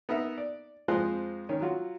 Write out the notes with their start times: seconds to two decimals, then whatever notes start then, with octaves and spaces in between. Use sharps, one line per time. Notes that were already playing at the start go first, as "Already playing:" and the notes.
0.09 B3 D#4 A#4 E5
0.38 D5
0.88 F2 F3 G#3 F4 C5 F#6
1.49 D#3 C#4
1.61 F#3 F4 F#4